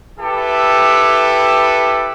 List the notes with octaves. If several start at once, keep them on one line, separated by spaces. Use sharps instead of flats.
E4 G4 A4 B4